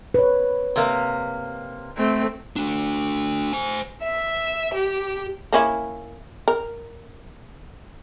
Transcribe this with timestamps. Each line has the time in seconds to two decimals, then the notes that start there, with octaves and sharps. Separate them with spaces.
0.14 B4 C#5
0.76 C3 A#3
1.97 A3 C4
2.56 A3 D4
3.53 C5 G#5
4.02 E5
4.74 G4
5.53 A#3 C#4 E4
6.48 A#4